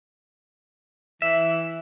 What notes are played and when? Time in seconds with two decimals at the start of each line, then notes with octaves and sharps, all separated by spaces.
1.22 E3 E5